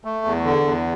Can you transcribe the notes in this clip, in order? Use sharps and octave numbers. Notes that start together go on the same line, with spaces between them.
A3
E2
D3
E2